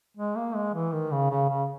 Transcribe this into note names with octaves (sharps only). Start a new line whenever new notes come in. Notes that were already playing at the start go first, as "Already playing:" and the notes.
G#3
A#3
G#3
E3
D#3
C#3
C#3
C#3